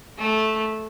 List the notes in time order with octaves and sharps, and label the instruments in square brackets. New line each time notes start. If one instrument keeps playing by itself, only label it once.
[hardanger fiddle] A3